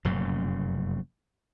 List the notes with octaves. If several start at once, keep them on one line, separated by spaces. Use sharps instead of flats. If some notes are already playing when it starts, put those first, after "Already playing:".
F1 F#2 A#2 C#3